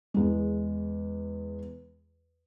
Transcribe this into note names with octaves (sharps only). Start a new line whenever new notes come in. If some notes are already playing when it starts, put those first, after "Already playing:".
E2 G#3